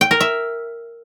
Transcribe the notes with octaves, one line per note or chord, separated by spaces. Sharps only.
G5
A#4
E5